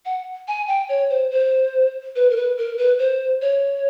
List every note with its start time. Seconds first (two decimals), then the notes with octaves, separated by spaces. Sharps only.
0.05 F#5
0.48 G#5
0.68 G5
0.89 C#5
1.10 C5
1.31 C5
2.16 B4
2.30 A#4
2.37 B4
2.58 A#4
2.78 B4
2.99 C5
3.42 C#5